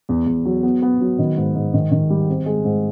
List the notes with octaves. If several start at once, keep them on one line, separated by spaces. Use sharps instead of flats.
E2
E2
F#3
B3
B3
F#3
D#3
G#2
G#2
D#3
D#3
G3
C4
G#3
G#2